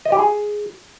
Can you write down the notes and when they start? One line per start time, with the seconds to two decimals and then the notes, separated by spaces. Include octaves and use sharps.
0.05 D#5
0.12 G4
0.19 G#4